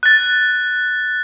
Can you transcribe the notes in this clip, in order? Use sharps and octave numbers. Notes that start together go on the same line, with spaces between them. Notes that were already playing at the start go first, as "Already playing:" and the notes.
F#6 A6